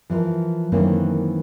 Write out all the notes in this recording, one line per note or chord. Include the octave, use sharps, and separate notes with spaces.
E3 F3 A#4
F#2 D#3 E3 A3 A#3 C4